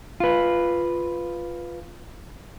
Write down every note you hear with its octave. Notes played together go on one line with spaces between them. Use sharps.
F4 B4